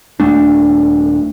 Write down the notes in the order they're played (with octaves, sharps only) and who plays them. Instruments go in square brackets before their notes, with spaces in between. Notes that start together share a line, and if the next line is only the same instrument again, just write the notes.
[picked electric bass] D#1 A3 D4